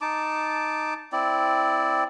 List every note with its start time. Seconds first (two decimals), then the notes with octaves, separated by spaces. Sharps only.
0.01 D#4 A5 D6
1.12 C4 E4 D5